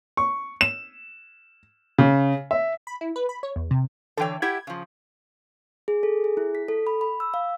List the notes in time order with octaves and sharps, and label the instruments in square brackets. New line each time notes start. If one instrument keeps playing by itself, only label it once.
[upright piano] C#6
E7
C#3
E5
[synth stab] B5
E4
B4
B5
C#5
E2
C3
[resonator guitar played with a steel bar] D3 E3 C#5 [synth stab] A4 G5
[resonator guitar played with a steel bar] E4 G4 F#5 [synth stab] G#6
[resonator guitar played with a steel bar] C#3 F3
[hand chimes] G#4
A4
G#4
E4
B6
A4
B5
B5
E6
F5